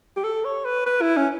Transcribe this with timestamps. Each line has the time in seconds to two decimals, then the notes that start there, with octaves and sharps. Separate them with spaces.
0.17 G4
0.24 A4
0.45 C#5
0.65 B4
0.86 B4
1.01 E4
1.17 C#4